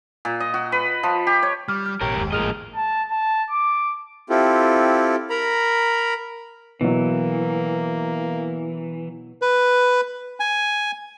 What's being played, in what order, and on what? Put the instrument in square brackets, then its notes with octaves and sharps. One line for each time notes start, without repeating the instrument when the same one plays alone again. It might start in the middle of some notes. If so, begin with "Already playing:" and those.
[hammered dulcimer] A#2
D#5
F#4
B4
F3
G4
C#5
[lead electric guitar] G3 [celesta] D6 F6
[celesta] F6
[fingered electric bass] A1 B2 [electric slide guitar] G4 A#4 [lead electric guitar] C#5
[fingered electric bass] F#1 D#2 [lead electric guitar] G#2
[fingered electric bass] G#1 A2 [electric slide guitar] F3 A#3 D#5 [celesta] G#4 F6 F7
[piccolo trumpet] A5
A5
D6
[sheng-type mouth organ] C4 E4 F4 G4 A4
A#4 A#5 B5
[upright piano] B2 F#3 [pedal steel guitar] E3 [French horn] A#3
[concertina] B4
G#5